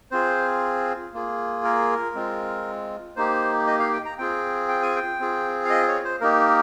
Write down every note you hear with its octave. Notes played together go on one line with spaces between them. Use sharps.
C4 F4 G#4 C5
A#3 F4 G#4
A#4
G#3 C4 F4
A#3 D#4 G4 C5
D#5
F5
G5
A#5
C4 F4 G#4 G5
G5
G#5
G5
C4 F4 G#4
F5
D#5
C#5
C5
A#3 D#4 G4 A#4